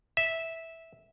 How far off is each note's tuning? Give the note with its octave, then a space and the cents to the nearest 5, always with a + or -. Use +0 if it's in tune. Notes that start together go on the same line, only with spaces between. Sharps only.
E5 -10